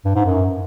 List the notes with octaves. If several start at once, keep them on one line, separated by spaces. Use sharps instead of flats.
G2
G#2
F#2